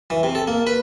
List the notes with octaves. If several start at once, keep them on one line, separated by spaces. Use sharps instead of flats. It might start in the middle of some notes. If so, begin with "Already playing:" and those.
E3
C3
A4
A#3
B4